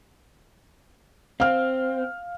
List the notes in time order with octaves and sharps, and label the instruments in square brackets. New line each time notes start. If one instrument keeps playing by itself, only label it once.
[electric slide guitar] C4 [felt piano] F5 F6